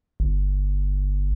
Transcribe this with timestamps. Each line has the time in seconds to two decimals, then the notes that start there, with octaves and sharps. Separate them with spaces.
0.20 G1